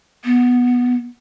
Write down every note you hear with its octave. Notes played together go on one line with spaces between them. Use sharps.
B3